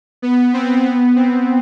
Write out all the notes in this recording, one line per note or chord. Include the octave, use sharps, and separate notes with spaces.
B3
C4
B3
C4